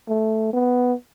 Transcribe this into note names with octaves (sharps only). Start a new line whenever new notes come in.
A3
B3